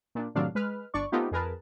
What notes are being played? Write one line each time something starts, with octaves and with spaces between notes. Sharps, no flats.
A#2 D4
A2 C3 D#3 F#3 D4 F5
G#3 B4 F6
G1 D4 D5 C#6
A3 B3 C4 D#4 F4 G4
F2 G#4 A#4 B4 A5